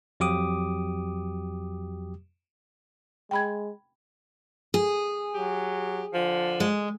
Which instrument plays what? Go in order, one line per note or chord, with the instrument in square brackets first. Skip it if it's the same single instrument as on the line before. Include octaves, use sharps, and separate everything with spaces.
[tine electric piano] F2 F#3 G4 D6 D#6
[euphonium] G#3 [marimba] G5 B5 G#6
[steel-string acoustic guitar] G#4
[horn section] F#3 G4
D3 F3
[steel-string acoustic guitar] G#3